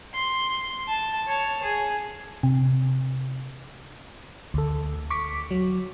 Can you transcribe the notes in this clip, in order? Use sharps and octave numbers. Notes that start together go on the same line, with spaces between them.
C6
A5
C#5 A5
G#4
C3
D2 A4
C#6 D6 B6
F#3